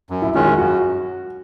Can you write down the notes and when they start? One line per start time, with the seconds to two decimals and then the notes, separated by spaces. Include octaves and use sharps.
0.10 F#2
0.22 E4
0.34 D#3 G#3 C#4 F4
0.47 F#4
0.58 F#2 F#4